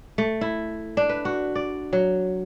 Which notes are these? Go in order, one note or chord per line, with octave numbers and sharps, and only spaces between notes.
A3
E4
D4
B4
F#4
D5
F#3